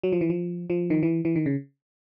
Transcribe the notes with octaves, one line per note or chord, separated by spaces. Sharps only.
F#3
F3
E3
F3
F3
D#3
E3
E3
D#3
C#3